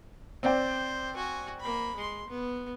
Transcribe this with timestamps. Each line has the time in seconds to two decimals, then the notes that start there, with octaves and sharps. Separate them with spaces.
0.43 C4 C5 D5 G5
1.15 F#4 G#5
1.60 A#3 B5
1.96 G#3 C6
2.28 B3